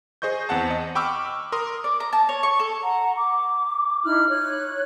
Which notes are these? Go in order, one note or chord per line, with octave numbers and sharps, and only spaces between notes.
G#4 C5 D#5 C#6 G6
E2 C4 F#5 A5
D#5
G5 B5 C#6 D6 E6 F6
D6
A#4 C6 D#6
D5
A#5
A5
C#5
C#6
A4
F#5 A#5
D6
D#4 E4 F6 F#6
C#5 F#6